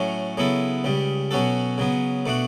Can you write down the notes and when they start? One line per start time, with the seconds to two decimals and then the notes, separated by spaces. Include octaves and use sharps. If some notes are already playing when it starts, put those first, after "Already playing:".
Already playing: A2 F#3 A3 C#4
0.37 C#3 F#3 B3 E4 A4
0.84 C#2 C#3 G3
1.31 B2 F#3 C#4 F#4 A4
1.78 C#3 F#3 B3
2.26 B2 A3 D4 F#4